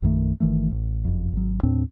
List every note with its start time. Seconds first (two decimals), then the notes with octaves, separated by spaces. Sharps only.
0.02 A#1 F#2 D#3 A3
0.40 G1 D#3 E3 A3
0.71 A1
1.05 F#1 F2
1.32 G#1 F#3
1.63 D#2 A2 C4 D4